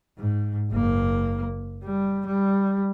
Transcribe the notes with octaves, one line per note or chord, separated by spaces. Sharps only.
G#2
F#1 A#3
G3
G3